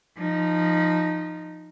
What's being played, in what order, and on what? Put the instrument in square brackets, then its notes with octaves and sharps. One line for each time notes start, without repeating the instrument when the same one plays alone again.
[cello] F3 D#4